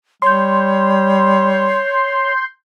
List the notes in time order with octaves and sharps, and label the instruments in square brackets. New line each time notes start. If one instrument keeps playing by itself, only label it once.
[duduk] G3 [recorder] C#5 [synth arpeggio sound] C6 G6